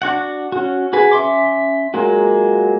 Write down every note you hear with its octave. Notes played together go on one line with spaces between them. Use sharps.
D4 F#4 F#5
C#4 F#4
F#4 G#4 B4
C#4 E5 C6 D6
F#3 G#3 A#3 F4 F#4